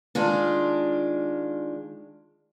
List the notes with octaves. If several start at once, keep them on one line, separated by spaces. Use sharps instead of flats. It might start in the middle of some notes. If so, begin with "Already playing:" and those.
D#3 G#3 D4 F4